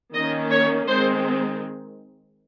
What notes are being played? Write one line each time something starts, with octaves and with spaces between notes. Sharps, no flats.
D#3 A#3 C#4 D#5
C#5
D#3 G#3 C4 C5